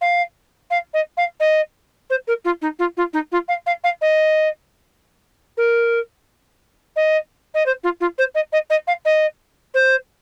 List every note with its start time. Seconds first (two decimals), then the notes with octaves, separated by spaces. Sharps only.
0.01 F5
0.70 F5
0.93 D#5
1.17 F5
1.40 D#5
2.10 C5
2.27 A#4
2.45 F4
2.62 D#4
2.79 F4
2.97 F4
3.13 D#4
3.32 F4
3.48 F5
3.66 F5
3.84 F5
4.01 D#5
5.57 A#4
6.96 D#5
7.54 D#5
7.66 C5
7.83 F4
8.00 F4
8.18 C5
8.35 D#5
8.52 D#5
8.70 D#5
8.87 F5
9.05 D#5
9.74 C5